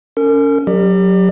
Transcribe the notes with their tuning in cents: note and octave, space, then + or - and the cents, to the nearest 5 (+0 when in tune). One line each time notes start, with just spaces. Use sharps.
C#4 +20 A#4 -40
F#3 +0 G4 +15 D5 +40